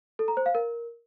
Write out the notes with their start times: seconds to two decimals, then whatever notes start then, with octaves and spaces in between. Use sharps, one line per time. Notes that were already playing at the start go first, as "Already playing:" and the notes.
0.19 A4
0.28 A#5
0.37 C5
0.46 F5
0.55 A#4